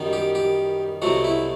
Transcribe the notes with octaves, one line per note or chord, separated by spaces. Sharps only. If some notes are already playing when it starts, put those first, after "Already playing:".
Already playing: F#2 D#3 G3 B3
G4
G4
C2 B2 F#3 A3 F#4
E4